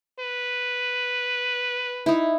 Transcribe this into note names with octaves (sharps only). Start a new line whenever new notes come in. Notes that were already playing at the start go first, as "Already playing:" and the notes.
B4
D#4 E4